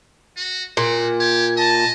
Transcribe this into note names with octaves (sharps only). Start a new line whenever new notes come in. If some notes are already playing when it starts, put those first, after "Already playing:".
F#4
A#2 F#4
G4 G#6
D#5 A5